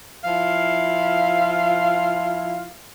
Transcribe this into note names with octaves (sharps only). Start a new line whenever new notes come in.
F3 E4 F4 F5